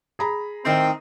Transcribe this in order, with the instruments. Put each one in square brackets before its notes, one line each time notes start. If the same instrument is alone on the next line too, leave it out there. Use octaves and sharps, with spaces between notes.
[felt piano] G#4 A#5 B5
[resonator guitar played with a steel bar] A2 D#3 D#4 [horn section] C4 C5 [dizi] G5